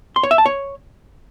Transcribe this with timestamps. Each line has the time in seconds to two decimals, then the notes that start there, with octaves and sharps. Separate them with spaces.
0.16 C6
0.23 C#5
0.31 E5
0.38 A5
0.46 C#5